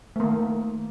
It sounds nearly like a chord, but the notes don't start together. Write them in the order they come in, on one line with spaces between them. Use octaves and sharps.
A3 A#3 D#3